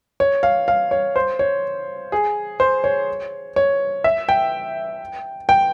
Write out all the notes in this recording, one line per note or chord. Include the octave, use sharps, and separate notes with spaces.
C#5
F5
F5
C#5
C5
C#5
G#4
C5
C#5
C#5
E5
G5
G5